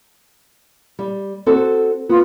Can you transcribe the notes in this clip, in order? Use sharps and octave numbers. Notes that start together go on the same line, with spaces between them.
G3
C4 F#4 A4
B3 F4